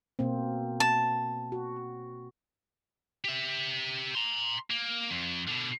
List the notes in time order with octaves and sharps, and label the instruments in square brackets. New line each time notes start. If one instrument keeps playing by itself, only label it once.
[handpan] B2 A#3 C4
[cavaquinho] A5
[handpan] F#4
[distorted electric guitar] G4 E5
A#5 C6
A#3
F2
B2 D3